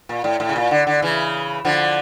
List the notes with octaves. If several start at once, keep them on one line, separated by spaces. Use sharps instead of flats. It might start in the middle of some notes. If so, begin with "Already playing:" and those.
A#2
A2
A2
C#3
A#2
D3
D3
C#3 E3
D3 F3